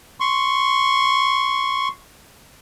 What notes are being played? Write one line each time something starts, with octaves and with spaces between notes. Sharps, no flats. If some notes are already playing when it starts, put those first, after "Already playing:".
C6 C#6